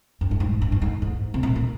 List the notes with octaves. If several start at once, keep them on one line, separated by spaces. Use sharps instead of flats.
G2
G2
G#2
G2
G2
G#2
G#2
C3
A#2
A#2